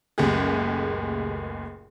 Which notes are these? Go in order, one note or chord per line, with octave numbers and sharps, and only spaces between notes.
F#1 C#2 A#2 A3 G4 G#4